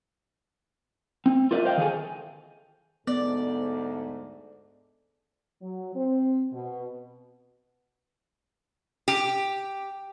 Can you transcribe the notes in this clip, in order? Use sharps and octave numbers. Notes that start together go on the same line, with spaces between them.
C4
F4 G4 A#4 B4 D5 E5
C5 D#5 F5 G5
D#3 G#4 A4 G#5
D2 G#2 B3 A4 D5
F#3
C4
B2
G4